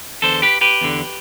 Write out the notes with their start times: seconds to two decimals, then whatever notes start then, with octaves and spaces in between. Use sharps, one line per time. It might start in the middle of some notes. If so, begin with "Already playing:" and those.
0.22 E2 D3 A4 C5
0.42 G4 B4
0.61 G4 B4
0.81 E2 D3